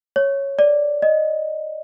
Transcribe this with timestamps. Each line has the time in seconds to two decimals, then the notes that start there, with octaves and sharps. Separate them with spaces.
0.16 C#5
0.59 D5
1.02 D#5